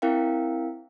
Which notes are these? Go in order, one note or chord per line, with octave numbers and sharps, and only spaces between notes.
C4 E4 A#4 F5 G5